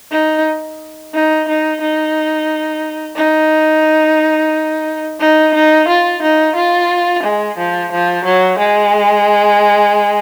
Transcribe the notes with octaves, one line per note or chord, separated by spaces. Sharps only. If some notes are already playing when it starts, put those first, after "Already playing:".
D#4
D#4
D#4
D#4
D#4
D#4
D#4
F4
D#4
F4
G#3
F3
F3
F#3
G#3